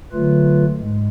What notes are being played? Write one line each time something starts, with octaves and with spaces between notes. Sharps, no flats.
D3 F#3 A3 F4 B4
G#2 G#3